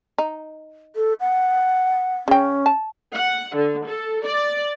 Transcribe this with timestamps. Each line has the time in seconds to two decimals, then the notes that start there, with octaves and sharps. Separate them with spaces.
0.18 D#4
0.96 A4
1.20 F#5
2.28 C#3 C#4 G5
2.66 A5
3.13 F#5
3.55 D3
3.86 A4
4.23 D5